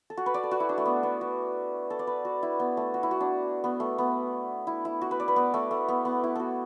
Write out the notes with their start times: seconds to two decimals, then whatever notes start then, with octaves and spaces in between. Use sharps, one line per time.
0.10 A4
0.17 F#4
0.26 B4
0.34 D5
0.43 A4
0.51 F#4
0.60 E4
0.69 D4
0.78 A3
0.86 B3
1.03 B3
1.21 F#4
1.90 A4
1.99 D5
2.07 B4
2.25 F#4
2.43 E4
2.60 B3
2.77 A3
2.94 F#4
3.03 E4
3.11 F#4
3.21 D4
3.64 B3
3.80 A3
3.98 B3
4.67 E4
4.85 E4
5.02 F#4
5.11 B4
5.20 D5
5.28 B4
5.36 B3
5.54 A3
5.71 A3
5.89 B3
6.05 B3
6.24 E4
6.36 F#4 A4